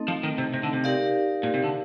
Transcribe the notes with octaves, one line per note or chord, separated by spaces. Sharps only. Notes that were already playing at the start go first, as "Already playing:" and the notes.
Already playing: A3 C4 D#4 A4 D#5
F3
D#3
C3
C3
D3
C3
D#4 G4 A#4 D5 F5
A#2
C3
D3